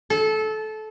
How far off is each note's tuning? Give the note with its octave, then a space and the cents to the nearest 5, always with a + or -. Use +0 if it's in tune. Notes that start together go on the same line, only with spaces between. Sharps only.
A4 -20